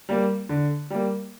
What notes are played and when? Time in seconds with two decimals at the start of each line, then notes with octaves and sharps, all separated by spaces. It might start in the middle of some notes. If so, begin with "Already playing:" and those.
0.09 G3 A#3
0.49 D3
0.90 G3 A#3